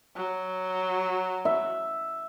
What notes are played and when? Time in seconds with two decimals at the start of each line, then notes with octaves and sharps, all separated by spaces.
0.15 F#3
1.45 E5